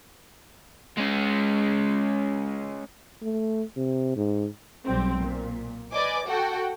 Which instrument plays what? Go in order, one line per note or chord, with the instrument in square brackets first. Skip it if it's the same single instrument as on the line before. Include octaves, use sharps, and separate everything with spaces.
[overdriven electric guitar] G#3 C#4
[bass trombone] A3
C3
G#2
[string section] B1 G3 C4
A#2
B4 D5 D#5 G#5 D6
F#4 A4 F#5 G5